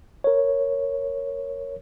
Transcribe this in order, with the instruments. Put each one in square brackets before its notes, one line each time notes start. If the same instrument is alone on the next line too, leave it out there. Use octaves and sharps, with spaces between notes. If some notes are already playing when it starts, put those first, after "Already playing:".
[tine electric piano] A#4 C#5